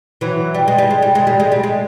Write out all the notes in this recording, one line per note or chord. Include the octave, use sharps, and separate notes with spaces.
E3 F#3
G3
G#3
G3
G#3
G3
G#3
G3
G#3
G3
G#3